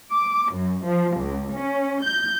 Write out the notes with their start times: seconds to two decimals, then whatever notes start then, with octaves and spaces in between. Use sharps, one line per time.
0.11 D6
0.52 F#2
0.85 F3
1.18 C#2
1.55 C#4
2.03 G6